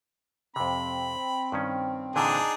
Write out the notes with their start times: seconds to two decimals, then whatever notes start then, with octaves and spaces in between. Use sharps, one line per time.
0.56 F2 C3 C4 B5
1.52 G2 D#3 C#4
2.16 A#2 D3 E3 D4 D#4 G#4